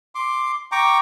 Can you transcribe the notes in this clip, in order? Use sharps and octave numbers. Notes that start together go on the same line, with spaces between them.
C6 D6
G5 A#5 C#6 D6